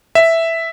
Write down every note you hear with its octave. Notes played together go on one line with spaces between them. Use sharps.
E5